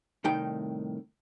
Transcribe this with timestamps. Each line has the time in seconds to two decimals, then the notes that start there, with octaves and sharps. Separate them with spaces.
0.24 C2 A2 D#3 D#4 G5